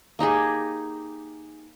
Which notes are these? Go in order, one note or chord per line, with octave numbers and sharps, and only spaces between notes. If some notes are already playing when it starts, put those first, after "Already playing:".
A#3 D#4 G4 G#4